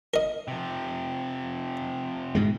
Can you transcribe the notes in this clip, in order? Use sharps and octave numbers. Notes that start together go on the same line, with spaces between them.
A#4 D#5
C3 F3
G#2 B2 G#3